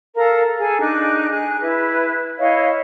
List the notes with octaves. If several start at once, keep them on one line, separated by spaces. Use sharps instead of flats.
A4 A#4 F5 A#5
G#4 A4 G#5
D4 D#4 F#6
G#4 F#6
E4 B4
E4 C#5 D#5 F5